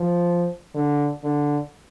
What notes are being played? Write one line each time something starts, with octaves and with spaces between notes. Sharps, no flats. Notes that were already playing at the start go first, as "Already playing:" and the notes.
Already playing: F3
D3
D3